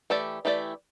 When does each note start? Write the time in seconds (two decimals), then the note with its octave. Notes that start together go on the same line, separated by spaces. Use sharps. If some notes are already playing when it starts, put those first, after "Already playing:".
0.10 E3 A3 E4 G4 D5
0.45 E3 A3 E4 G4 D5